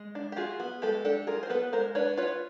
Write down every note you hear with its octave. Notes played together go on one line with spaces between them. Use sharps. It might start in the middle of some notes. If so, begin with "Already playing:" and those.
Already playing: G#3
D4
G4
F4 F#4 G#4
B3
G#3 G4 A4
D4 G4 A4
F4 G#4 A#4
C5
B3 A4 B4
G#3 A#4 C5
D4 B4 C#5
F4 B4 C#5